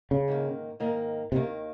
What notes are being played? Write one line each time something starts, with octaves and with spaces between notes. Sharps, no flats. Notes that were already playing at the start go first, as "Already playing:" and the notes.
C#3
G#2 D#3 A#3
G#2 D#3 A#3
D#2 C3 D#3 A#3